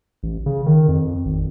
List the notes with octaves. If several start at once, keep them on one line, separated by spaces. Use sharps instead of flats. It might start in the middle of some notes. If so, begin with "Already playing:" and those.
A1
C#3
D#3
F2
G#1